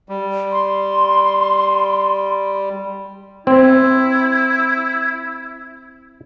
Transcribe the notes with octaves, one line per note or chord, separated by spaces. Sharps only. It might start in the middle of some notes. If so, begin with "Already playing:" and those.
G3
C6
C4 E4